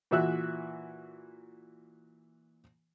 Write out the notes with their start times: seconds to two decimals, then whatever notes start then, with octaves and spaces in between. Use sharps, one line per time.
0.11 A#2 E3 F#4 E5 E6 F#6